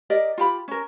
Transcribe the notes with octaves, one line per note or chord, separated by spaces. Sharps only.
G4 A#4 D5 D#5
F4 G4 B5
C#4 A#4